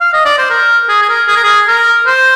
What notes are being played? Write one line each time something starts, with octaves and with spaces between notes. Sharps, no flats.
F5
D#5
D5
C5
A#4
G#4
G#4
A#4
G#4
A#4
G#4
A#4
C5